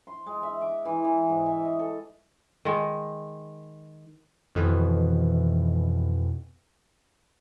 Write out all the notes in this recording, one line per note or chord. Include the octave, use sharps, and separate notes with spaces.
C6
G#3
E5
D6
E3
E3
G#2
E5
D#5
A4
D#3 G#3
F2 B2 D#3 E3